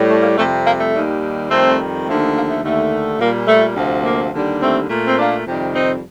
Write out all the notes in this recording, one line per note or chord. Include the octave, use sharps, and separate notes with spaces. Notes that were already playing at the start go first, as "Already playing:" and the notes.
Already playing: A2 G3
A3
A#3
F2 C3 G3 A3
A#3
A3
D#2 D#3 G3
F2 D#3 G3 A3 C4
D#2 D3 F3 A3
A#3
A3
D#2 D3 A3
A#2 G3 A#3
A3
D2 C3 F3
A#3
D#2 D3 G3
A3 C4
A#2 A3
C4
A#3 D4
F2 C3 D#3 G3
C4 D#4